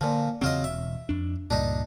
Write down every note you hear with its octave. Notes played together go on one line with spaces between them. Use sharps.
A#2 D3 F3
E2 C#3 F#3 C4 F4 D#5
E1 E5
F2 D4
C#2 G2 A#2 D4 D#4